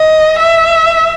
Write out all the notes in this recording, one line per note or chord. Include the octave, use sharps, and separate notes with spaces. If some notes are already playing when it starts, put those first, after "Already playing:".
Already playing: D#5
E5